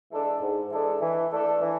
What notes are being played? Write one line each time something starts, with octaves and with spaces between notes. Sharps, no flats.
E3 G#3 D4 A4
G#2
E3 G#3 D4 A4
E3
A3 D4 A4
E3